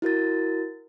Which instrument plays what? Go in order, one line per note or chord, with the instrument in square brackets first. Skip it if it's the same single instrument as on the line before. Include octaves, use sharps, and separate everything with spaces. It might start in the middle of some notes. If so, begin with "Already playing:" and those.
[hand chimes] E4 F#4 A#4 A6